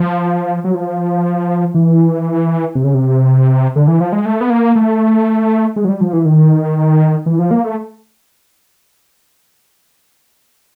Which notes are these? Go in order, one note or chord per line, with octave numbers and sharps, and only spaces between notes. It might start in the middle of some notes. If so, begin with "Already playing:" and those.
Already playing: F3
F#3
F3
E3
C3
C#3
C3
D3
E3
F3
G#3
A3
B3
A#3
A3
G#3
F#3
G3
F3
E3
D#3
E3
F3
A#3
A3